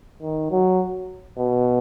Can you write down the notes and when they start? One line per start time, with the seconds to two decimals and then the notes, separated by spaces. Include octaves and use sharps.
0.22 D#3
0.51 F#3
1.38 B2